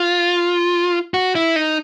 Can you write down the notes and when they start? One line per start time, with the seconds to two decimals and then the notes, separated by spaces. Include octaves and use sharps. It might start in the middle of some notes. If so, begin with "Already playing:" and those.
Already playing: F4
1.14 F#4
1.35 E4
1.56 D#4